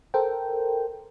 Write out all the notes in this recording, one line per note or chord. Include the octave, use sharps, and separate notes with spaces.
A4 A#4 C5 G5